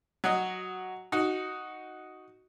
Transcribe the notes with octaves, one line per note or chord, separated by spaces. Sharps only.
F#3 F#4 D#5
D#4 F#4